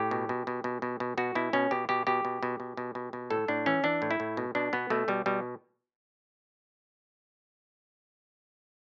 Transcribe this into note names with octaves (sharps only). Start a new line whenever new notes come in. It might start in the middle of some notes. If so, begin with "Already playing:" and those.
Already playing: A2 G4
B2
B2
B2
B2
B2
B2
B2 F#4
B2 E4
B2 C#4
B2 G4
B2 G4
B2 G4
B2
B2
B2
B2
B2
B2
A2 A4
A2 D4
E3 C#4
E3 D4
A2
E4
A2
B2
B2 D4
B2 B3
B2 A3
B2 G3
B2 G3